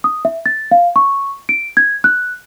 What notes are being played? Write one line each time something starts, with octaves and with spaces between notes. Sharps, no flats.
D#6
E5
A6
F5
C#6
D7
G#6
F#6